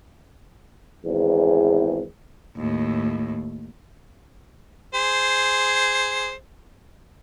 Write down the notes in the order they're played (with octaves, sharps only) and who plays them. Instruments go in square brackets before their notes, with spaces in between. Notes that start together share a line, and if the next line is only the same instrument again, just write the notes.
[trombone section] G#1 E2
[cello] D#2 A2
[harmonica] G#4 C5